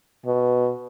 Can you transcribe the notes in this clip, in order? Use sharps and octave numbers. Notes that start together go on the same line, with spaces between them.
B2